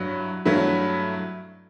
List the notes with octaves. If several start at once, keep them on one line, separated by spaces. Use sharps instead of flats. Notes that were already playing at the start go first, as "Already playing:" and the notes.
Already playing: G2 F#3 E4
G2 F#3 A3 E4